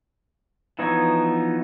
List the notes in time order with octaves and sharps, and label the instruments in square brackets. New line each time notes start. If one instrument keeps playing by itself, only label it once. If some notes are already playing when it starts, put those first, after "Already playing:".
[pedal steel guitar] E3 F3 B3 D#4 C#5